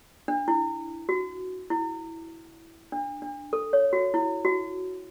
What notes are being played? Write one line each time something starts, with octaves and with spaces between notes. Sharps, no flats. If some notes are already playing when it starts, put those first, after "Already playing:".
D4
E4
F#4
E4
D4
D4
A4
C#5
F#4
E4
F#4